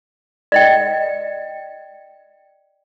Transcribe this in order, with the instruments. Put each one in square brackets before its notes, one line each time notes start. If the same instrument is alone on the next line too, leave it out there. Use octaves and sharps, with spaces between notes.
[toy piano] D5 D#5 G5